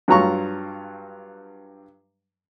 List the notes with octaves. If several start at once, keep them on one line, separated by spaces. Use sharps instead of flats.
G2 F#3 F4 A#5 C#6